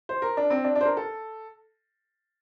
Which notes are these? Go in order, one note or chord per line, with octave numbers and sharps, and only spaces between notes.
C5
A#4
D4
C4
D4
D4
C5
A#4
A4